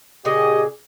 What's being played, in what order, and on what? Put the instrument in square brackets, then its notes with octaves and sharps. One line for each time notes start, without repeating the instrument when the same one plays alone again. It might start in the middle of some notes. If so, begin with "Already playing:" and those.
[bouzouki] A#2 C#3 G#4 [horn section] G4 D#5